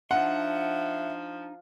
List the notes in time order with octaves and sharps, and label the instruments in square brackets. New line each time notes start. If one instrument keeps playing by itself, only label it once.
[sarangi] F3 [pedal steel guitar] D4 D#4 C6 [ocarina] E5 [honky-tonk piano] F#5